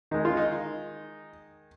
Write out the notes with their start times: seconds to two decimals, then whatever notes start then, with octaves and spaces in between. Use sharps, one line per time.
0.11 D#3 G#3 D#4
0.25 F4
0.37 D#4